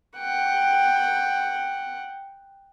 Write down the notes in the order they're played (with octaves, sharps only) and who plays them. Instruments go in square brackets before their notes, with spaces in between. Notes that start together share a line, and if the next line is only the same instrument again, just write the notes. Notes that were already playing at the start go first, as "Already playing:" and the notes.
[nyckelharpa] F#5 G5